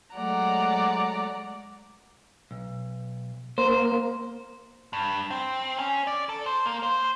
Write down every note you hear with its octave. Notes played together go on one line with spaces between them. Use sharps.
F#3 G#3 A3 D5 F#5 A#5
B1
A#3 C5
G2
C4
C#4
D5
A4
C5
A#3
C5